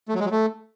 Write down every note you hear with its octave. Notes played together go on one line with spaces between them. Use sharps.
A3
F#3
G#3
F#3
A3